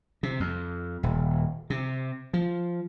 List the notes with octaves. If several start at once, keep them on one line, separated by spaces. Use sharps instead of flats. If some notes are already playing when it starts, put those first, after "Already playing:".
C3
F2
D#1
C3
F3